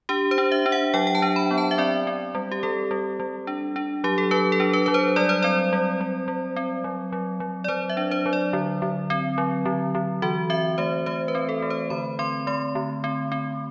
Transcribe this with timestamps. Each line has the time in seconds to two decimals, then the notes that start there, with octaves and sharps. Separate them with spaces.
0.09 D4 G4
0.31 C5
0.38 D4
0.52 E5
0.66 D4
0.72 F#5
0.94 F#3 G5
1.07 G5
1.15 A5
1.22 D4
1.36 B5
1.51 B3
1.58 A5
1.71 E5
1.78 C4 D5
2.07 C4
2.35 G3
2.52 G4
2.63 G3 A4
2.91 G3
3.20 G3
3.47 D4
3.76 D4
4.04 F#3 G4
4.18 A4
4.31 F#3 B4
4.52 A4
4.60 D4
4.73 B4
4.86 F#3 B4
4.94 C5
5.16 G3 D5
5.29 C5
5.42 C4 D5
5.73 G3
6.01 G3
6.28 G3
6.56 C4
6.84 F#3
7.12 F#3
7.40 F#3
7.64 D5
7.68 F#3 C5
7.90 E5
7.97 D4
8.11 C5
8.26 F#3
8.33 D5
8.53 D3
8.82 D3
9.10 C4
9.38 F#3
9.66 D3
9.95 D3
10.22 E3 F#4
10.50 C4 E5
10.78 A3 C5
11.06 A3 C5
11.28 B4
11.35 C4
11.49 A4
11.62 A3
11.70 C5
11.90 D3 B5
12.19 C4 C6
12.47 A3 C6
12.75 D3
13.04 C4
13.32 C4